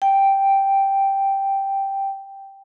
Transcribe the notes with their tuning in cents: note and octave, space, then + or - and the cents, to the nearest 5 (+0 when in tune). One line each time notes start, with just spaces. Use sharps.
G5 +0